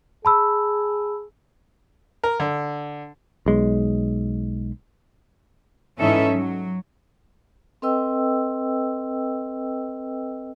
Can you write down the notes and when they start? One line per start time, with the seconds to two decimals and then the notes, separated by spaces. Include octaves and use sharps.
0.25 G#4 A5 B5 E6
2.24 A#4
2.40 D3
3.46 B1 G#3
5.97 G#2 E3 C#4 D#4 A4 E5
6.33 F#3
7.82 C4 A4 B4 D#5 G5 E6